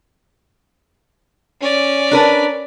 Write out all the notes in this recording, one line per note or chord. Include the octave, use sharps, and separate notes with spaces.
C#4 D5
D4 A#4 B4